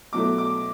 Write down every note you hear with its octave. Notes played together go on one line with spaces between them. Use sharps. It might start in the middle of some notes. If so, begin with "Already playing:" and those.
B2 F#3 A3 D6
D6